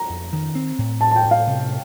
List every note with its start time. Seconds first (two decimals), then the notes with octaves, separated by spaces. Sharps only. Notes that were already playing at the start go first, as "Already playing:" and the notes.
Already playing: A#5
0.09 F2
0.33 D#3
0.55 C4
0.78 A2
1.01 A2 A5
1.11 A5
1.16 G5
1.25 A2
1.31 F5
1.47 C3